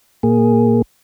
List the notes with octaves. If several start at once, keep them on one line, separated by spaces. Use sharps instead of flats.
A#2 A#3 G#4